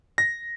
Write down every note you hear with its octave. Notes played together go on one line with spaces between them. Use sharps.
A#6